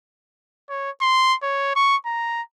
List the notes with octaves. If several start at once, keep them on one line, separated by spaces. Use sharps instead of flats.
C#5
C6
C#5
C#6
A#5